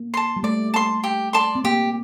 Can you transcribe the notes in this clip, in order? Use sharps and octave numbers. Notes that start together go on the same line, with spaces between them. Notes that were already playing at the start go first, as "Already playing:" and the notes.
Already playing: A#3
A5 C6
G3
A3 D5
A5 C6
G4
D5 A5 C6
C4
A#3 G4